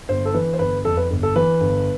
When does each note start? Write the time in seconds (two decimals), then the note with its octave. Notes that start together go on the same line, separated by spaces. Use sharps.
0.09 G1 C5
0.25 A4
0.34 E3 B4
0.53 C5
0.59 G1 B4
0.85 F2 A4
0.97 B4
1.10 G1
1.23 A4
1.35 E3 B4
1.61 G1